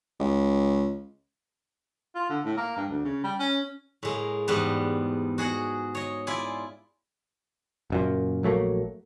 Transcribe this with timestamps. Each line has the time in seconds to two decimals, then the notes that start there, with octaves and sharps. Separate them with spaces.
0.20 C#2
2.15 F4
2.30 D3
2.45 A2
2.57 A#3
2.77 G2
2.89 D2
3.05 C#3
3.24 G3
3.39 C#4
4.03 A2 G#3 A#3
4.48 E2 G#2 G3 B3
5.38 F#4 G#4 D#5 F#5
5.95 C#5 D#5
6.27 E4 F4 D5 G#5
7.90 F#1 F#2 A#2
8.43 A#1 F#3 A3 A#3